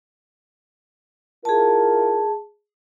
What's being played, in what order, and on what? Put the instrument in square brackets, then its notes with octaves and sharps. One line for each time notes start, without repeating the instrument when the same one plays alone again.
[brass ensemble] E4 F4 A#4 [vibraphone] G#4 A5